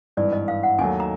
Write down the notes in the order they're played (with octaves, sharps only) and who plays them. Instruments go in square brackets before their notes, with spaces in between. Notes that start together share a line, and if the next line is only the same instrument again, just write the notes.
[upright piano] G#1 G2 E3 [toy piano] D5
[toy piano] D#5
F5
F#5
[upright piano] D#2 D#3 F#3 A3 [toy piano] G#5
[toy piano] A#5